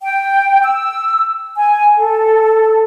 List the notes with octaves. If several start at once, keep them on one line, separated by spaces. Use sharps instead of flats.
G5
E6
G#5
A4